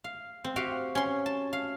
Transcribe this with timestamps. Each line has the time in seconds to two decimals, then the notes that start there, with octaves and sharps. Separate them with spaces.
0.04 F5
0.44 C4
0.56 F#4 G4 F5
0.95 C#4 C6
1.26 A5
1.53 F5